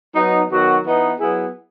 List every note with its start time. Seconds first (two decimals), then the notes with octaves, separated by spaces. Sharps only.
0.15 F#3 B3 D#4
0.50 D#3 F#3 B3 F#4
0.85 E3 B3 D#4
1.20 F#3 B3 E4 G#4